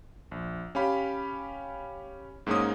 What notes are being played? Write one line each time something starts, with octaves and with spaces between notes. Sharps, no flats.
A#1
C#4 G4 F5 B5
G#2 G#3 A#3 C#4 D#4 D#6